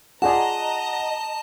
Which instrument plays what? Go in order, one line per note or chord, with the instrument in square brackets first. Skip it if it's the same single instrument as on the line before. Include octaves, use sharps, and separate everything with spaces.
[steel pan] F4 G#4 D5 [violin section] D#5 A#5 [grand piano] F#5 [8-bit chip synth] A5